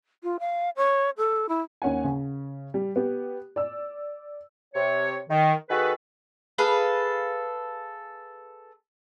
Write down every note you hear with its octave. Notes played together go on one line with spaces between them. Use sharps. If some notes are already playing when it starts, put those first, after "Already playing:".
F4
F5
C#5
A4
E4
D#2 C#4 F#5 G#5
C#3
G3
B3 G4
D5 E6
C3 C#5
D#3
D#3 F#4 G#4 A4 B4
G#4 A4 B4 F5